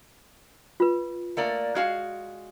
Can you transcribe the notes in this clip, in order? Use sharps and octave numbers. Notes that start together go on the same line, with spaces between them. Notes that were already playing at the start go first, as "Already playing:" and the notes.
F4 B4
A3 A#3 D5
G#3 F#4 F5